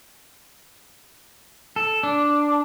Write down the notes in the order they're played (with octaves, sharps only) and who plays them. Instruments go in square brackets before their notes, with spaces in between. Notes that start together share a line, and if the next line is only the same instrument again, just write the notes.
[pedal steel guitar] A4
D4